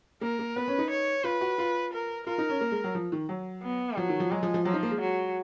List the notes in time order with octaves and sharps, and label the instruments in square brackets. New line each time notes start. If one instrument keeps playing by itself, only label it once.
[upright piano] A#3 [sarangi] A#4
[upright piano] A#3
[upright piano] B3 [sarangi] B4
[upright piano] C#4
D#4
[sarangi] C#5
[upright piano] F4 [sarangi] B4
[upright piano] F#4
F4
[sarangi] A#4
[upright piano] F4 [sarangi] A#4
[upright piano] D#4
C#4
A#3
G#3
F#3
F3
D#3
F#3
[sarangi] B3
[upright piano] F3 [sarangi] F#3
[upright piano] D#3
F3
[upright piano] F#3 [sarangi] G#3
[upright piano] F3
F3
[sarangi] F3 [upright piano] F#3
[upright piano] D#4
A#3
G#3
[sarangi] F#3